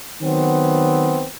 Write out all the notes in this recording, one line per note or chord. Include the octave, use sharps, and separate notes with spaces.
D#3 F#3 B3 C4